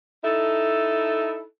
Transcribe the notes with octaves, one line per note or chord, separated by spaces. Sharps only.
D#4 E4 A4